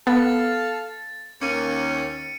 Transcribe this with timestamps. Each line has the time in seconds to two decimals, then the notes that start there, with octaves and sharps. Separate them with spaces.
0.07 B3 A4 F5 A6
1.41 D#2 A#3 C#4 C#7 D#7